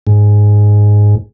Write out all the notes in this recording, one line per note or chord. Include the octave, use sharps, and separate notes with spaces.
G#2